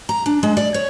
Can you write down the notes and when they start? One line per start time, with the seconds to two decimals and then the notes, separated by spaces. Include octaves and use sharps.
0.09 A#5
0.26 D4
0.43 G#3
0.57 D5
0.74 C#5